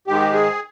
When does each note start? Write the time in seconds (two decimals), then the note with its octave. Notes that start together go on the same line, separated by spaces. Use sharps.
0.07 G#2 D#3 G#3 G4
0.33 G#4